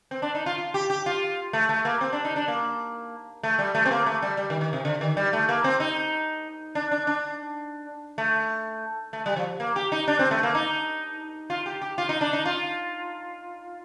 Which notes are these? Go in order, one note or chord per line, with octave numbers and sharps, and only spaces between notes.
C4
D4
D#4
F4
F4
G4
G4
F4
A3
A3
A#3
C4
D4
D#4
D4
A#3
A3
G3
A3
C4
A#3
A3
G3
G3
D#3
D#3
C3
D3
D#3
G3
A3
A#3
C4
D#4
D4
D4
D4
A3
A3
G3
F3
A#3
G4
D#4
D4
C4
A3
A#3
D#4
F4
G4
G4
F4
D#4
D4
D#4
F4